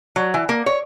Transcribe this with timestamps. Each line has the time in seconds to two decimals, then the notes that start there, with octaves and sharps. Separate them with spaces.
0.16 F#3
0.34 E3
0.49 A#3
0.66 C#5